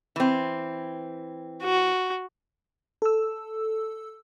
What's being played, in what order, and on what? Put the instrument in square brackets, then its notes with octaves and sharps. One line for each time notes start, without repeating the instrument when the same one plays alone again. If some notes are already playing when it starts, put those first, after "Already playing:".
[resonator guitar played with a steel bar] E3 C4
[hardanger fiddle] F#4
[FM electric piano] A4 E6